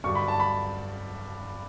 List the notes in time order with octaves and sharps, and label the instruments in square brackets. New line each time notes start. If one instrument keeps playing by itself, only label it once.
[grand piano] G2 D3 F#3 C#6
B5
A5
B5